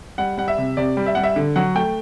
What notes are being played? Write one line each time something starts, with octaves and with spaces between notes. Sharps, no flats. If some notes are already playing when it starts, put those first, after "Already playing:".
G3 F#5
G3 F#5
E5
C3
C3 D5
G3
E5
G3 F#5
E5
D3
F#3 F#5
A3 G5